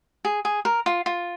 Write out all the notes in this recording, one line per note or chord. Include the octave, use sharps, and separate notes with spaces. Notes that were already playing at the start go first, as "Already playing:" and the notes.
G#4
G#4
A#4
F4
F4